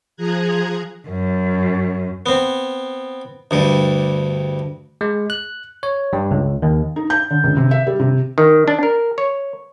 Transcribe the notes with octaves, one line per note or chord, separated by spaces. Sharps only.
F3 G#4 A#5 F#6 G#6
F#2
B3 C4
D2 G2 G3
G#3
F#6
C#5
G2
C#2
D#2
D#4
G6
D3
C#2
C3
E5
G3
C3
D#3
D4
A#4
C#5